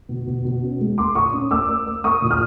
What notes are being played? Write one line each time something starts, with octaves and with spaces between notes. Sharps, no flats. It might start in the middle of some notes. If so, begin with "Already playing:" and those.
B2
B2
B2
C#4
G#3
A#3 C6 D6
A#2 C#6 D#6
C#4
A#3 D6 E6
A#3
A#3
A#3 C#6 D#6
A#2
D#6 F6